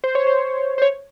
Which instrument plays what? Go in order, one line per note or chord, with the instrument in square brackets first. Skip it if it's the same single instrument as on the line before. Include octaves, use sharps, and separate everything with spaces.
[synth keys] C5
C#5
C5
C5
C#5